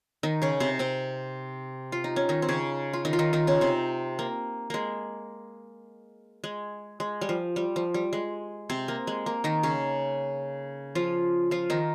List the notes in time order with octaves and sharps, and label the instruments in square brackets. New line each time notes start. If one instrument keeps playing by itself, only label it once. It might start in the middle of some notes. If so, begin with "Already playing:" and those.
[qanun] D#3 D#4
C#3 C#4
C3 C4
C3 C4
F4
D#4
C#4
D#3 D#4
C4
C#3 C#4
F4
D#3 D#4
F4
D#3 D#4
D#3 D#4
C#3 C#4
C3 C4
A#3
G#3 A#3
G#3
G#3
G3
F3
G3
F3
G3
G#3
C3 C4
A#3
G#3
A#3
D#3 D#4
C#3 C#4
F3 F4
F3 F4
D#3 D#4